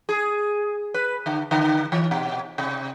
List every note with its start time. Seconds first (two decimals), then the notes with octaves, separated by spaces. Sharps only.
0.09 G#4
0.94 B4
1.26 D3
1.51 D3
1.92 E3
2.11 B2
2.58 C3